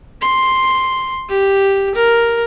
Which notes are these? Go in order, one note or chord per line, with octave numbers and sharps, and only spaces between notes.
C6
G4
A#4